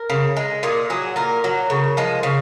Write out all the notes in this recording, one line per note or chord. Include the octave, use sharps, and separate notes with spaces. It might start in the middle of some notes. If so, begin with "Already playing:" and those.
Already playing: A#4
C#3
G#3
A#2 G#4
F#3 G#4
A#2 A#4
F#3
C#3
F3 G#3
C#3